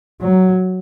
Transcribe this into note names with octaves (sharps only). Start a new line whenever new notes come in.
F#3